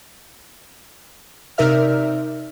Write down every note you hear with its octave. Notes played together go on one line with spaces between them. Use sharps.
C3 D#4 A#4 D5 E5 F6